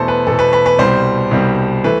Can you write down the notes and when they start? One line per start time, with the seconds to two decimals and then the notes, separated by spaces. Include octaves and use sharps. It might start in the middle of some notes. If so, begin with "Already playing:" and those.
Already playing: E2 B2 A3 A4 C5
0.08 B4
0.26 E2 B2 A3 A4
0.39 B4
0.53 B4
0.66 B4
0.79 C2 B2 G3 C5
1.31 C2 B2 G3
1.84 E3 A3 B4